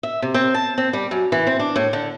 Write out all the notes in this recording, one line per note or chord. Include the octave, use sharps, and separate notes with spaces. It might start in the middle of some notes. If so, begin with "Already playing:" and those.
E5
C3
C4
A5
C4
G3
F#2
E3
C4
D4
A2
D3